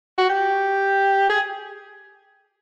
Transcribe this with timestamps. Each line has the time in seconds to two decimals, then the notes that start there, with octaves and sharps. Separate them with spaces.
0.18 F#4
0.29 G4
1.29 G#4